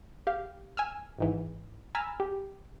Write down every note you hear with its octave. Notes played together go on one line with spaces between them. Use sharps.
G4 F5
G#5 E6 F6
G#1 G#2 E3
G#5 A#5 B5 E6 F6 A6
G4